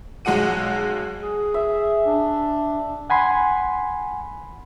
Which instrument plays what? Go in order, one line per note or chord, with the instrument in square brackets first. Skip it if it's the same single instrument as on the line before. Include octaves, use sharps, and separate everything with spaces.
[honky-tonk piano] B1 G#3 F#4 F#5 D#7
[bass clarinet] G#4
[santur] E5
[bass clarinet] D4
[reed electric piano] F#5 G#5 B5 C6